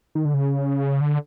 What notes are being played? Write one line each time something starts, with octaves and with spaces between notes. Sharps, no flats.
D#3
D3
C#3
D3